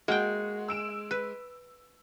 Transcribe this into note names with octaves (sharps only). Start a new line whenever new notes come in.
G#3 A#3 F#4 G5
E6 D7 E7
B4